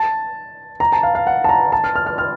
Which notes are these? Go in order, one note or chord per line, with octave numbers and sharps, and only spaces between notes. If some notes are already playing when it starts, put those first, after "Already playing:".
Already playing: A5
A#5
A5
F5
F5
F#5
A5
A#5
A5
F6
F6
F6
F6